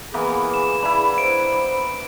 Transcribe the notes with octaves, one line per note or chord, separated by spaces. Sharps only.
E3 A#3 B3 G#4
E7
D4 E4 B5
C5 D7